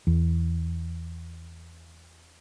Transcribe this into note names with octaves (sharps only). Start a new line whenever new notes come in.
E2